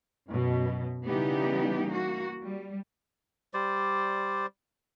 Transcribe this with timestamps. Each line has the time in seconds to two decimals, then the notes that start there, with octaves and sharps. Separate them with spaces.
0.29 F#2 B2
1.06 C#3 E3 G3 B3 D#4 G4
1.89 A#3 F#4
2.43 G3
3.54 G3 C5 D5